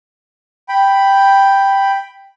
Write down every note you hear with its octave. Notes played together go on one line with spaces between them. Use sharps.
G5 B5